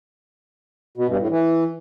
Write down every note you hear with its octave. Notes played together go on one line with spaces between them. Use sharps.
B2
G2
A2
E3